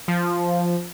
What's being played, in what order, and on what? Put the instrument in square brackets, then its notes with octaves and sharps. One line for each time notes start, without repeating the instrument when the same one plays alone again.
[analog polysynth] F3